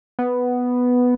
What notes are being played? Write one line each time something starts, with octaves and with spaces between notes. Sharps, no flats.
B3